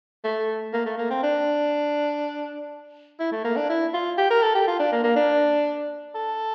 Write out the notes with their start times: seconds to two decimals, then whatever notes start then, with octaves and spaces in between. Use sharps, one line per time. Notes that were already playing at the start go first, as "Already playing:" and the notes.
0.24 A3
0.73 A#3
0.86 A3
0.98 A#3
1.10 C4
1.23 D4
3.19 E4
3.32 A3
3.44 A#3
3.56 D4
3.69 E4
3.94 F4
4.18 G4
4.30 A#4
4.42 A4
4.55 G4
4.67 F4
4.79 D4
4.92 A#3
5.04 A#3
5.16 D4
6.15 A4